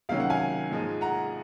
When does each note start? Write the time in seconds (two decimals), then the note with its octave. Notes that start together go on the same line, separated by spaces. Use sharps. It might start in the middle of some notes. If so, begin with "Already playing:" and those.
0.09 C#2 C3 D#3 F#3 C#4 F5
0.20 F#5
0.30 F5 G#5
0.71 G#2 F3 G#3 D#4
1.01 F#5 A#5